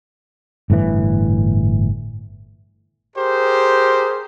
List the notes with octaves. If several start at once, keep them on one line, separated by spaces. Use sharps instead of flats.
G1 A2 C3 E3
G4 G#4 A#4 C5